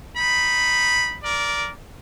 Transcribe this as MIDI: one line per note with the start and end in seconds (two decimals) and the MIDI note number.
0.17 1.16 63
0.17 1.16 83
1.23 1.70 70
1.23 1.70 74